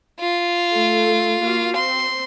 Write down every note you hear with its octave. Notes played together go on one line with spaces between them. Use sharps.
F4
A3 A4
A#3 F#4 F5
C4 C6